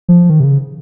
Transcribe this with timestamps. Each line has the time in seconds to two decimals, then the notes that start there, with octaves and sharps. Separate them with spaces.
0.09 F3
0.30 D#3
0.40 C3
0.44 C#3